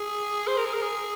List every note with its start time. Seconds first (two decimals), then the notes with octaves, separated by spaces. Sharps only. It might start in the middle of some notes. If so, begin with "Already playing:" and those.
Already playing: G#4
0.48 C5
0.58 A#4
0.66 G#4
0.74 A#4
0.82 G#4